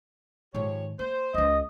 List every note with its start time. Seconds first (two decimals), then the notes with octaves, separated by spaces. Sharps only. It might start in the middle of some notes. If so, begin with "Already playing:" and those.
0.54 G#2 D#3 F3 G4 C#5
0.99 A#3 C5
1.34 D1 C#2 D#5